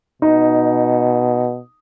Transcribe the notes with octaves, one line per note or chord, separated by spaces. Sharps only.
B2 D#4